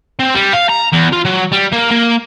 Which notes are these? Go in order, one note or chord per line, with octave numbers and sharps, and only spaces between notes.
C4
G3
F5
A#5
E2
F4
F#3
G3
A#3
A#3